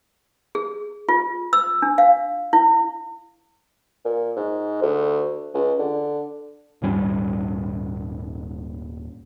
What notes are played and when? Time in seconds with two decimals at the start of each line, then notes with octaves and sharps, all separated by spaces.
0.55 G#4
1.09 F4
1.53 E6
1.82 D4
1.98 F5
2.53 E4
4.04 A#2
4.37 G#2
4.82 D2
5.54 C#2
5.79 D3
6.82 D#1 G#2 G3 C#4